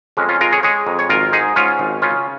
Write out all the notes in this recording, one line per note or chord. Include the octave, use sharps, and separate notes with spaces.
F2 G#3 C#4
C#4 F4
G#3 F4 A#4
G#4 C#5
G#3 G#4 C#5
F2
C#5
G#1 F4 A#4
G#2 D#4 G#4
G#2 C#4 F4
G#1
C#3 C#4 F4